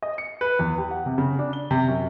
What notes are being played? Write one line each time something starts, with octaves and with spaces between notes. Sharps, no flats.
D#5
C#7
B4
E2
G4
F#5
C3
C#3
D4
G7
C3
F#2